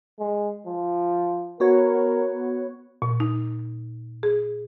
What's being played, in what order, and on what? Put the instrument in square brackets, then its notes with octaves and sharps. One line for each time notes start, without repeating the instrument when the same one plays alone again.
[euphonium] G#3
F3
[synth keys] B3 F#4 C#5 [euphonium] A#4
[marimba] A#2
D#4
G#4